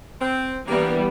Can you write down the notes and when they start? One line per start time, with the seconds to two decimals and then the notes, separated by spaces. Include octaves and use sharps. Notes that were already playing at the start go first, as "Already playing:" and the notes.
0.20 C4
0.68 E3 G3 A#3 B3 D4